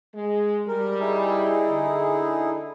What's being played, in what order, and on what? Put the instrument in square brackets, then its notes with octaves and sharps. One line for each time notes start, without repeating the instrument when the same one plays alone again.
[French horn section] G#3
[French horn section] G3 [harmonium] A#4
[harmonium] D#4 E4 G#4
[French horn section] D3